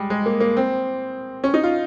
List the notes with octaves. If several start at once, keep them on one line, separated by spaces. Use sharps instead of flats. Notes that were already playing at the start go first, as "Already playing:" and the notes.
Already playing: G3 G#3
G#3
A#3
A#3
C4
C#4
D#4
F4